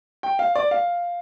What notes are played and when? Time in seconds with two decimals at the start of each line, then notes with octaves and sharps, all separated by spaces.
0.23 G5
0.39 F5
0.55 D5
0.71 F5